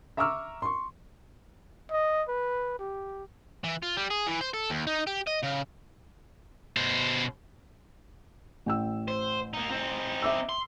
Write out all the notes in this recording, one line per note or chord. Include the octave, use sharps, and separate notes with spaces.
E5 A#5 C#6 D6 E6 F6
C6 C#6
D#5
B4
G4
E3
F4
G3
G#4
E3
C5
A4
D#2
D#4
G4
D#5
C#3
B2 C5
A1 G5 E6
C5
A#3 D#4
C4 D#4
E5 D6 E6
C6